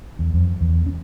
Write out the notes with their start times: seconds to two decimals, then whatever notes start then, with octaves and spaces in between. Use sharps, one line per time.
0.19 E2
0.34 F2
0.61 E2
0.86 C#4